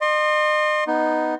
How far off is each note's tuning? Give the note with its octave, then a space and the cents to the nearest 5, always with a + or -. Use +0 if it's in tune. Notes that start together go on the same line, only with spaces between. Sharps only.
D#5 -40 C6 +20
B3 +0 D#4 +0